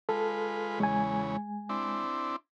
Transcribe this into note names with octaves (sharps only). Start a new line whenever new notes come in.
G#3 F4 A4 B4
E2 C#3 G#3 G#5
C4 D4 E4